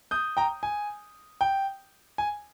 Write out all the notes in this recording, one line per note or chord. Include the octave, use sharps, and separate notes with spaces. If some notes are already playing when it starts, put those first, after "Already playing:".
D#6 G6
G5 A#5
G#5
G5
G#5